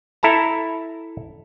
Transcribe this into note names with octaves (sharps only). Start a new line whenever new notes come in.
E4 A4 A5 A#5